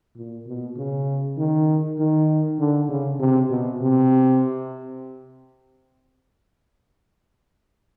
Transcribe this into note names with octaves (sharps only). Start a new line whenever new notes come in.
A#2
B2
C#3
D#3
D#3
D3
C#3
C3
B2
C3